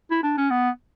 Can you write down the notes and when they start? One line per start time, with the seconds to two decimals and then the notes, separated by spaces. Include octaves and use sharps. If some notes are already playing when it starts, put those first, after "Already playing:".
0.11 E4
0.23 D4
0.37 C#4
0.50 B3